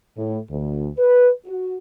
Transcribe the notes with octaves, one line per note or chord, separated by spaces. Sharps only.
A2
D2
B4
F#4